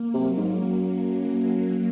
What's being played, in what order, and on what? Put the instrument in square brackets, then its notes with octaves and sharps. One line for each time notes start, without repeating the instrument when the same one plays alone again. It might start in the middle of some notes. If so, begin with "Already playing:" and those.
Already playing: [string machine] A#3
[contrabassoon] C3 [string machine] F#3
[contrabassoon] G#2
[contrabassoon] F#2 [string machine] F#3